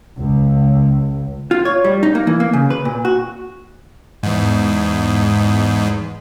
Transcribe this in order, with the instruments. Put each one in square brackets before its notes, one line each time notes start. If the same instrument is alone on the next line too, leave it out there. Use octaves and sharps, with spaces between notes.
[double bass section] C#2
[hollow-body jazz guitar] F4
C#5
G3
D#4
A#3
E3
A#3
C#3
B4
A#2
F#4
[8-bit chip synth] E2 G#2